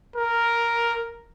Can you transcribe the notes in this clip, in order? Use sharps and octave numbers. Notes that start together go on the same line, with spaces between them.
A#4